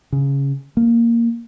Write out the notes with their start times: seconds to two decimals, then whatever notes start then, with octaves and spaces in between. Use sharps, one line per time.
0.12 C#3
0.77 A#3